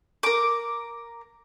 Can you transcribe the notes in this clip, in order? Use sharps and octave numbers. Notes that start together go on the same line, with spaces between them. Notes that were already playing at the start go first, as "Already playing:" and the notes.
A#4 D6